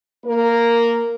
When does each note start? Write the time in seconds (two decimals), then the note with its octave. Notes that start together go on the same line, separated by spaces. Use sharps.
0.25 A#3 A#4